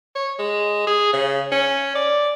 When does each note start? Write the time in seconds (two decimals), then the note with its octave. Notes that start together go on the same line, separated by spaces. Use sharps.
0.15 C#5
0.39 G#3
0.87 G#4
1.13 C#3
1.51 C#4
1.95 D5